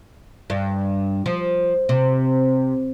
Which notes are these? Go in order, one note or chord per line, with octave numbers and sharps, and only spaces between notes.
G2
F3
C3